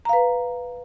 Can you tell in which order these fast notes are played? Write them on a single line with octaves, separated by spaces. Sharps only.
A#5 F5 B4